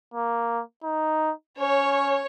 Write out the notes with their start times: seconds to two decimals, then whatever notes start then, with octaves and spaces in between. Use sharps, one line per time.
0.14 A#3
0.83 D#4
1.58 C#4 C#5